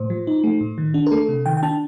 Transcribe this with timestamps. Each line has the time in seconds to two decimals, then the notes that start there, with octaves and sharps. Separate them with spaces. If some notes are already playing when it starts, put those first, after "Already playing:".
Already playing: A2 C5
0.10 F3
0.27 D#4
0.44 A3
0.61 A2
0.78 D#3
0.94 D4
1.07 A#4
1.11 A3 A4
1.29 C3
1.46 D#3 G5
1.57 G5
1.63 D4 A5